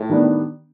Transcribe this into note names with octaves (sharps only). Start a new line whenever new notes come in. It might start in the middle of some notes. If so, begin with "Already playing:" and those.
Already playing: A2
D#3 G3 B3 D4